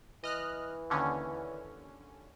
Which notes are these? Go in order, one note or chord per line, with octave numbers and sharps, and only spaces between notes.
E3 D#5 F6 F#6
D#2 D3 C#4